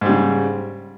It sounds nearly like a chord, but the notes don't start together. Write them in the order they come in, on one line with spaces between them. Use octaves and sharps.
G#2 G3 C#3